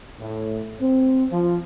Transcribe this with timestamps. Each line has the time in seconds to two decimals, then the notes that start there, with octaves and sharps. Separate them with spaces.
0.20 A2
0.80 C4
1.32 F3